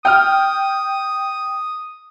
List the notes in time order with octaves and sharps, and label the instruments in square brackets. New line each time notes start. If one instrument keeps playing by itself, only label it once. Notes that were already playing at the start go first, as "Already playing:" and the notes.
[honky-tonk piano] G5 F6 [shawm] D#6